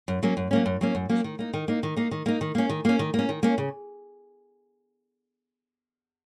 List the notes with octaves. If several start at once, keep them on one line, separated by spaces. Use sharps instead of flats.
F#2
F#3 A#3 C#4
F#2
F#3 A#3 C#4
F#2
F#3 A#3 C#4
F#2
F#3 A#3 C#4
D#3
A#3 D#4
D#3
A#3 D#4
D#3
A#3 D#4
D#3
A#3 D#4
D#3
A#3 C#4
D#3
A#3 C#4
D#3
A#3 C#4
D#3
A#3 C#4
C#3